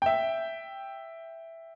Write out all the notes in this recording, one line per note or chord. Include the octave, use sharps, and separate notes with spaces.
E5 G5